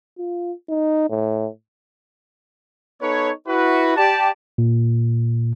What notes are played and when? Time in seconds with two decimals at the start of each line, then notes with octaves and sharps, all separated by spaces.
0.18 F4
0.69 D#4
1.10 A2
3.02 B3 D#4 A4 B4 C#5
3.48 E4 F#4 B4
3.97 G4 D5 A5
4.58 A#2